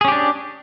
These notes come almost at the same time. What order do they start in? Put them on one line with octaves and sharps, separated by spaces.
G#4 C#4 G4 D4